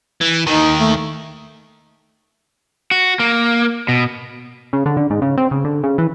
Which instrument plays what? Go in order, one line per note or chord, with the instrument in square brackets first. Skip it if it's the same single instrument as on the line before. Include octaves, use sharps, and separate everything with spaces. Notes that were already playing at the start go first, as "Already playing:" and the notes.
[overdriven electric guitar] E3
[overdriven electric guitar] D#2 D#3 [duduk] D#4
[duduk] A3
[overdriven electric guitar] F#4
A#3
B2
[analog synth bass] C#3
D3
D3
G#2
C#3
C4
C#3
D3
C#3
E3